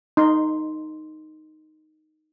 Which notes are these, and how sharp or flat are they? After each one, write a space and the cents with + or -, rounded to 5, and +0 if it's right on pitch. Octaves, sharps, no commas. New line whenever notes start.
D#4 +0 C6 +0